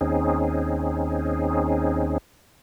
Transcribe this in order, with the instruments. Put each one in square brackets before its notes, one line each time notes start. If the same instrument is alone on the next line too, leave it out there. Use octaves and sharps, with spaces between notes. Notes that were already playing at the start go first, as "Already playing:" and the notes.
[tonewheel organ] D#2 C4 C#4 D#4 G#4